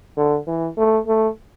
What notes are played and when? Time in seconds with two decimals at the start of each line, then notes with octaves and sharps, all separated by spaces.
0.17 D3
0.48 E3
0.77 A3
1.07 A3